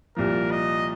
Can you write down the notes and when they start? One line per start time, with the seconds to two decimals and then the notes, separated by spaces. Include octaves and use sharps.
0.17 C2 A#2 F3 A#4
0.51 D#5